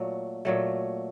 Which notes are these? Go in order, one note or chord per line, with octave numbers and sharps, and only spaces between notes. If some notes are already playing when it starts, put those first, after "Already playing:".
Already playing: A#2 F#3 A3
A#2 F#3 A3